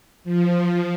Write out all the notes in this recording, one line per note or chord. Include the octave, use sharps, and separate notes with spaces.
F3